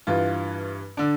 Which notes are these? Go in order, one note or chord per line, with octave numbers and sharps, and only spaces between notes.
G2 E3 F4
D3 D4